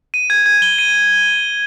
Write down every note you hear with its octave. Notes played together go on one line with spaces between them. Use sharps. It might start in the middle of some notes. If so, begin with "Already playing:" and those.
D#7
G#6
G#6
G7
D#7